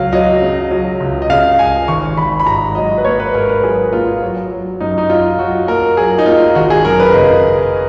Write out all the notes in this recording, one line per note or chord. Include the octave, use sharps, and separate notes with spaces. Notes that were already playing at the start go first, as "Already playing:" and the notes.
Already playing: C#2 F#3 F5
F#3 D#5
C#3
F#3
C#2
D#5
C#3 F5
C#2 G#5
G#1 C#6
G#1 B5
B5
G#2 A#5
F#3 D#5
B4
A#3 C#5
B4
G#2 A#4
B4
F#3 G#4
A#3 F4
F#3
F#3
F#2 D#4
D#4
F#3 F4
F#3 F#4
A#3 A#4
F#3 G#4
D#4
A#3 F4
G#1 F#4
G#4
F#2 A#4
B4
C#3 D#5